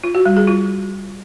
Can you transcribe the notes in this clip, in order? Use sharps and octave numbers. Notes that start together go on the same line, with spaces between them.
F4
F#4
G3
G#4
F4